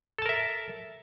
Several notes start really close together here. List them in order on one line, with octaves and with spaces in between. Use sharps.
A4 A5 A#4 E5